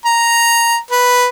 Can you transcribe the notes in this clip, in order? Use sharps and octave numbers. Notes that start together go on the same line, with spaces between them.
A#5
B4